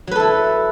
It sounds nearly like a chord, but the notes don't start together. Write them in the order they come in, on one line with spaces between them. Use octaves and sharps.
F#3 B4 A4 E4